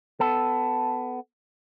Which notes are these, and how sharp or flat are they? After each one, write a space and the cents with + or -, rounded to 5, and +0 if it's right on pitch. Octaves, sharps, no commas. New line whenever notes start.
B3 +20 A4 +0